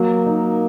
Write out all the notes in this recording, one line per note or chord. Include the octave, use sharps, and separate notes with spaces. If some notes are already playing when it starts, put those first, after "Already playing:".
Already playing: F#3 A#3
D#4